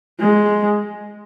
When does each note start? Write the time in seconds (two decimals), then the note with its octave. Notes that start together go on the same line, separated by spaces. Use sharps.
0.20 G#3